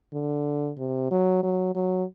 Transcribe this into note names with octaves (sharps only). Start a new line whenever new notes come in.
D3
C3
F#3
F#3
F#3